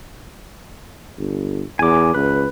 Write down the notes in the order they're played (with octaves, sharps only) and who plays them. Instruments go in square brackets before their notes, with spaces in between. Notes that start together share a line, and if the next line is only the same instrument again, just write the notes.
[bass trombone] G1
[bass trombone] E2 [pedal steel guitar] G#5 D6
[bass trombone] C#2 [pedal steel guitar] B4